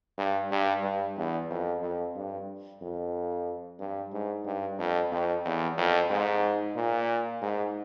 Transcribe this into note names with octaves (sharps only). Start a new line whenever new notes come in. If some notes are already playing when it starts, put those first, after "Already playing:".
G2
G2
G2
E2
F2
F2
G2
F2
G2
G#2
G2
F2
F2
E2
F2
G#2
A#2
G#2